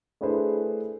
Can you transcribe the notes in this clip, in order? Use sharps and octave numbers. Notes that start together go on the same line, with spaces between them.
A3 D4 E4 G#4 B4 C5